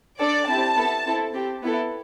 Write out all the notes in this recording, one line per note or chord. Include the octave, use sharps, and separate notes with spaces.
D4 A4 D5
C4 E4 G4 A5
B3 E4 A4
C4 E4 A4
C4 G4
B3 E4 A4